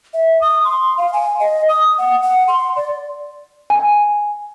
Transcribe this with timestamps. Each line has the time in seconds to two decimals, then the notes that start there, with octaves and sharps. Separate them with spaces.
0.14 E5
0.41 D#6
0.65 C6
0.98 F5
1.13 G#5
1.40 D#5
1.69 D#6
1.98 F#5
2.22 F#5
2.48 C6
2.76 D5
3.70 G#5